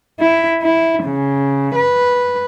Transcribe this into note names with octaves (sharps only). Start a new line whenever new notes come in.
E4
E4
C#3
B4